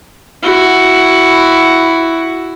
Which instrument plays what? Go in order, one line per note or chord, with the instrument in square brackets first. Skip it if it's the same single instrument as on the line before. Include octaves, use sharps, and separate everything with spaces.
[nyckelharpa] E4 F#4